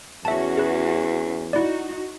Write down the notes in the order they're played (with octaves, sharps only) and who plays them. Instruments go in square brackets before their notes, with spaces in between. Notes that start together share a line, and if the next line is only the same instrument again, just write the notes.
[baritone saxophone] E2 [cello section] C#4 F#4 [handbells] E5 A5
[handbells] G#4 B4
[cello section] D#4 F#4 [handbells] E4 D5